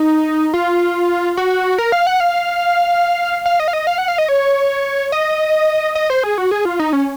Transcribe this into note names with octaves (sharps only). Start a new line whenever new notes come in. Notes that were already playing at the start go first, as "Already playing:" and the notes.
Already playing: D#4
F4
F#4
A#4
F5
F#5
F5
F5
D#5
F5
D#5
F5
F#5
F5
D#5
C#5
D#5
D#5
C5
G#4
F#4
G#4
F4
D#4
C#4